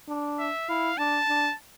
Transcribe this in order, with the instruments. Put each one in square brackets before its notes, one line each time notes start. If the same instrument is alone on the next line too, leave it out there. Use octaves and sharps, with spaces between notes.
[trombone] D4
[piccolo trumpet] E5
[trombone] E4 [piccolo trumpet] F5
[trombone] D4 [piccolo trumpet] A5
[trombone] D4